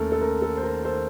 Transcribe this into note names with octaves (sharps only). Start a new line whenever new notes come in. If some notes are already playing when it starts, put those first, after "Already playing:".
Already playing: D#2 D#3 A3 C#4 A4 A#4
A4
A#4
A4
C5
A#4
A4 C5